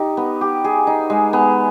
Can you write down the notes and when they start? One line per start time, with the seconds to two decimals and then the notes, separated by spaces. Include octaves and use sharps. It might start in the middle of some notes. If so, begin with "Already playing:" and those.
Already playing: D#4 G4
0.17 B3
0.41 G4
0.64 G#4
0.87 D#4
1.10 G#3
1.33 B3